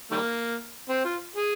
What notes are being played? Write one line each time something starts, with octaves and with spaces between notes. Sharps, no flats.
D#3 G3 A#3
C4
F4
G#4